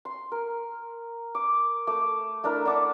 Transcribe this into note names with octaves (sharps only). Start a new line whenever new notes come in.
C6
A#4
D6
A3 D6
A3 D4 E4 A#4
D4 F#5 A5 D6